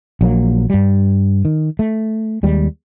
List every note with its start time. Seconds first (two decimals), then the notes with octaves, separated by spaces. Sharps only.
0.21 A#1 F#3 A#3
0.70 G2 G3
1.45 D#3
1.79 A3
2.43 D#2 G3 G#3